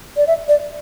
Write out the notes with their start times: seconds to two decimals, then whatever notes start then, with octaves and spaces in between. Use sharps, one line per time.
0.17 D5
0.27 E5
0.48 D5